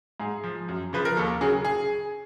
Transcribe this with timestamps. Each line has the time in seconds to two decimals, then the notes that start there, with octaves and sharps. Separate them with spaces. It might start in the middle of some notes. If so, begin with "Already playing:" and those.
0.20 G#2 G#4
0.44 F3
0.69 F#2
0.93 C#3 F3 B4
1.05 A#4
1.17 D#2 A4
1.41 C#3 F#3 G#4
1.65 G#4